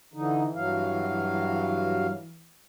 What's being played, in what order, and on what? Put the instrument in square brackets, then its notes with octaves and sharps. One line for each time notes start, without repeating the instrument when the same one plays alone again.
[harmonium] D3 D#4 [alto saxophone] E3
[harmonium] G2 F#3 F5